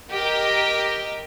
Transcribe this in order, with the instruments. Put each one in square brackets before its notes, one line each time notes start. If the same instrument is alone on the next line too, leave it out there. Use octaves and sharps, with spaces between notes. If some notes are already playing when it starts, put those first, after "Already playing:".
[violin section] G4 A#4 D#5 G5